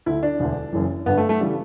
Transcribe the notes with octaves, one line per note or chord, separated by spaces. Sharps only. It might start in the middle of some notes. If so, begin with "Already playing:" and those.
D2 D3 E4
D4
E1 D2 D3
F#1 F#2 E3
G1 G2 D3 B3
A3
A3
C#3 E3 G3